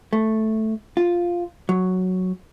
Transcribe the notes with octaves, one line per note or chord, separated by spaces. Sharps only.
A3
F4
F#3